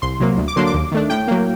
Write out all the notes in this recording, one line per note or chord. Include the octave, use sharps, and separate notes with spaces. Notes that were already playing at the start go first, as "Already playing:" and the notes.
C2 C6
C3 F#3 A#3
D2
D6
D3 F#3 A#3 D4 C6
D6
D#2
D#3 A3 D4
A2 G5
F#3 A#3